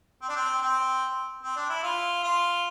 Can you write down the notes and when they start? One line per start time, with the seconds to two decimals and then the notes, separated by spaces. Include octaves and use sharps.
0.22 C4
0.29 D4
0.36 C4
0.62 C4
1.43 C4
1.56 D4
1.70 E4
1.83 F4
2.23 F4